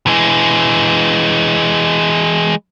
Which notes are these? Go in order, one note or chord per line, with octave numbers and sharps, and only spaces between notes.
E3 G#3